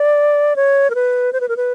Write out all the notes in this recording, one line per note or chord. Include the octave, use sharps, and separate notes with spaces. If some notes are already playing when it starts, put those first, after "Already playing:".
Already playing: D5
C#5
A#4
B4
C5
B4
A#4
B4